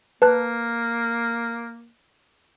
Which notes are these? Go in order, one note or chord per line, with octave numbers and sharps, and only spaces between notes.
A#3 B4 A5 F#6